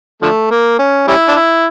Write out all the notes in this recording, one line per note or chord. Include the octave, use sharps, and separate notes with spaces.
D3 F3 A3
A#3
C#4
G3 C#4 E4
D4
E4